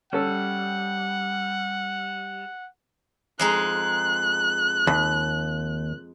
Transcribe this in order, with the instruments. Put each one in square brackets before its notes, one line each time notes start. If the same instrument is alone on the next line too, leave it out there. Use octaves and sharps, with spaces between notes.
[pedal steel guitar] G3 [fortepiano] C#4 A4 [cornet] F#5
[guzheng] F2 G#3 D#4 [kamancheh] F#6
[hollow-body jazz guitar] D#2